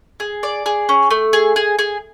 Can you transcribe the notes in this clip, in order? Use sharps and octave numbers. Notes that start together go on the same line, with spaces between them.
G#4
D5
G#4
C#4
A3
G#4
G#4
G#4